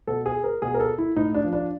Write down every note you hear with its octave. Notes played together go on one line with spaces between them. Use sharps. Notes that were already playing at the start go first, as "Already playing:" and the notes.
B2 A4
G#4
A#4
B2 G#4
A#4
A4
E4
A2 D#4
D4
F3
D4